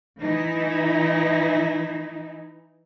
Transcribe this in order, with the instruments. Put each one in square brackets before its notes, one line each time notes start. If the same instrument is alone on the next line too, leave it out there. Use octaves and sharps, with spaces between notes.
[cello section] E3 D#4 E4